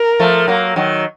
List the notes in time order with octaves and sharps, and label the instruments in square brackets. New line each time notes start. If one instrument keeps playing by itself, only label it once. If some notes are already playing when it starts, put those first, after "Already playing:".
Already playing: [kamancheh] A#4
[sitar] F3 A3
F#3 A#3
D#3 F#3